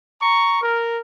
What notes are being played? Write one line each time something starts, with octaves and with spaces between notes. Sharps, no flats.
A#5 C#6
A#4